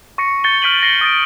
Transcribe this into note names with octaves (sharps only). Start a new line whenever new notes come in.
C#6 A#6 C#7
G6 A6 C#7 G7
F6 G6 B6 D7 D#7 F#7
A#6 C7 C#7 F#7 G7
D#6 A6 D7